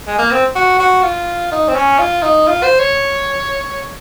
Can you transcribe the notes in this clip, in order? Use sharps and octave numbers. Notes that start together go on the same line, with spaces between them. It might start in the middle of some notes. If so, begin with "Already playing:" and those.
G#3
A#3
C4
F#4
F#4
F4
D#4
C4
C#4
F4
D#4
F4
C5
C#5